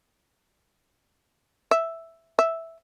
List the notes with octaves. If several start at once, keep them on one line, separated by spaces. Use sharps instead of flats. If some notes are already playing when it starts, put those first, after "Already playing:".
E5
E5